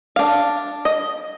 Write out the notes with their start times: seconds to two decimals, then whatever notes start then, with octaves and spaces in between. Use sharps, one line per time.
0.16 D4 F5
0.85 D#5